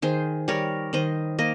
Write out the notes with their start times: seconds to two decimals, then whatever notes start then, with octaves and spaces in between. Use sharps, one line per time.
0.02 D#3 G#4 C5
0.48 G3 A#4 C#5
0.93 D#3 C5 D#5
1.39 A#3 D#5